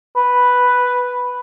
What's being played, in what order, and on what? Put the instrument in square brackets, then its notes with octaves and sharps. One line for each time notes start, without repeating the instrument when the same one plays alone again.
[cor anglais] B4